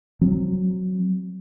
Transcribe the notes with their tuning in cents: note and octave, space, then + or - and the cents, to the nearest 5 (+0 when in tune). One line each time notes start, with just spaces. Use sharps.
F#3 +0 C4 +0